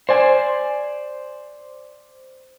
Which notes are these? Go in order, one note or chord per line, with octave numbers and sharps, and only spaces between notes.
C5 D5 G#5